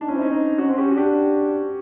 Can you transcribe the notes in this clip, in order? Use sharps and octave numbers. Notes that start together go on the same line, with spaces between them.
D4 D#4
C#4 E4
C4 D#4
C#4
C4 D#4
C#4 F#4
C4
C#4 G4
F#4
D4 G4